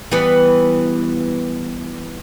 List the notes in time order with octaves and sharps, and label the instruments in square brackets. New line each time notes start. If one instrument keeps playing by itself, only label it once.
[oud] E3 G3 B3